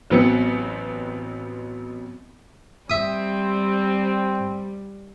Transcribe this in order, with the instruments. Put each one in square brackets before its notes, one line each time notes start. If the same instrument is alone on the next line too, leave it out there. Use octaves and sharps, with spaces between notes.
[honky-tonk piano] A1 F#3 B3 C4 C#7
[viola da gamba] G3 [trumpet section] C4 [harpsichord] E5 D#6